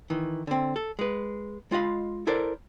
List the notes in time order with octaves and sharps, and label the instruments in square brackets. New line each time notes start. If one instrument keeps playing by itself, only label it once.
[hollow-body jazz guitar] D#3 E3
D3 C4
A4
G#3 B4
G#3 F4 D#5 F5 B5
E4 A4 A#4 C5 D5